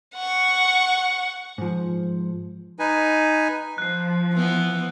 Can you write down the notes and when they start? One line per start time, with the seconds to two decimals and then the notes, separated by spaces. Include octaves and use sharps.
0.15 F#5 C#6
1.58 G#2 F3
2.79 D#4 B4 G#5
3.78 F3 F#6 C7
4.34 E3 B3